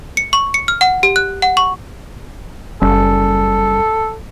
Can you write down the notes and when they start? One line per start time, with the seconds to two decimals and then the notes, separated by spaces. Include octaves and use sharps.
0.17 C#7
0.33 C#6
0.54 C#7
0.68 F6
0.81 F#5
1.03 G4
1.16 F#6
1.42 F#5
1.57 C#6
2.82 F#1 G3 C#4 A4